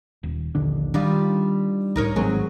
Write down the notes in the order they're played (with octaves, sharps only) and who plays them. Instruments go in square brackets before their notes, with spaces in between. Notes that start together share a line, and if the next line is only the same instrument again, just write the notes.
[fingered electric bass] D#1
[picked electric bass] A#1 D#2 D4 [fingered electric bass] D3
[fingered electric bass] D#3 [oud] G3 D#4 F4 [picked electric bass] D4
[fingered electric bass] C#2 A2 [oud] D#4 A#4 C#5
[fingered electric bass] G#1 [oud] F#3 G#4 [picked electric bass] G#3 B3 C4